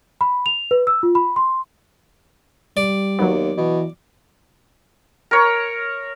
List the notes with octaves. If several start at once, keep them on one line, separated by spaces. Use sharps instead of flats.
B5
F7
B4
E6
F4
B5
C6
G3 D5
D#2 F#3 B3
B2 E3
A#4 C#5